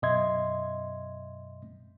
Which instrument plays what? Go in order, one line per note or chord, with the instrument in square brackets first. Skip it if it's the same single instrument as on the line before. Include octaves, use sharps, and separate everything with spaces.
[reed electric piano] F#2 B2 D#5 E5 C6 G#6